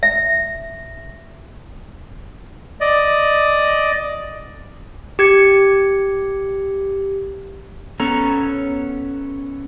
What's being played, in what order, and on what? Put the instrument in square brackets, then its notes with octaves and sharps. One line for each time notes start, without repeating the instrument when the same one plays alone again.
[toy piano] E5
[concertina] D5 D#5
[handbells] G4 G#6 C#7
[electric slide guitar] B3 C#4 A4 C#5 A#5